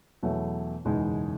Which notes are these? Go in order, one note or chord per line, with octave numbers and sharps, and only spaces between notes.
E2 B2 F#3 A3
F#1 E2 B2 G#3 D#4